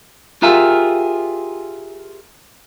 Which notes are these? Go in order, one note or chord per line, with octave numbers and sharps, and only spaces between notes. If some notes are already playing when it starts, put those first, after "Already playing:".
F4 G4 G#4 A#4 E5 F5